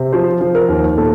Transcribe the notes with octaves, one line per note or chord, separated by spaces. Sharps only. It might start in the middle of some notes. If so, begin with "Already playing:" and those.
Already playing: C3
F3 C5
F3
A#4
D#2
A#2 A4